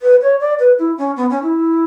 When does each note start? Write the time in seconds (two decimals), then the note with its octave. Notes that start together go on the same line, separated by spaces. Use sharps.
0.02 B4
0.22 C#5
0.40 D5
0.59 B4
0.79 E4
0.98 C#4
1.17 B3
1.30 C#4
1.43 E4